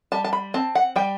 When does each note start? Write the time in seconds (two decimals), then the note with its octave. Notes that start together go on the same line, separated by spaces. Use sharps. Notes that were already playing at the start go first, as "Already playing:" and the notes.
0.12 G3 A5
0.24 A5
0.33 B5
0.54 C4 A5
0.75 F#5
0.96 G3 G5